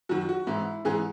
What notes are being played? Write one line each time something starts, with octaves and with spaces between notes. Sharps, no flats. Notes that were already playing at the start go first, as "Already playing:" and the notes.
F#2 D#3 F#3 F#4
F#4
G#2 E3 E4
G#2 E3 G#4